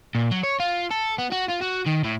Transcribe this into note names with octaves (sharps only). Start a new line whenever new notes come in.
A#2
F#3
C#5
F4
A4
B3
F#4
F4
F#4
D#3
A2